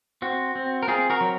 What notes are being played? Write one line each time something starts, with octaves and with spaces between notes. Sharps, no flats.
C4 F#4
C4
A#4
C4 F4 G#4
F#4 A#4
F#3